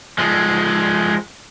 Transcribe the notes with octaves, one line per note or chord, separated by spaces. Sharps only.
F3 G#3